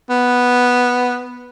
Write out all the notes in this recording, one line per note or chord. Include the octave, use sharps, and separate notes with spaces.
B3